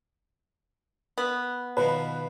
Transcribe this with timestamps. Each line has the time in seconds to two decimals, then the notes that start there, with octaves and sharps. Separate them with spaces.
1.18 B3
1.77 B2 D#3 F3 B4